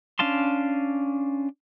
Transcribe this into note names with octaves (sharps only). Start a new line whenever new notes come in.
C#4 D4 F5 A5 C6